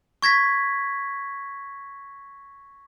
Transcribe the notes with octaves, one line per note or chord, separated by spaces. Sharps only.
C#6 G#6 A#6 B6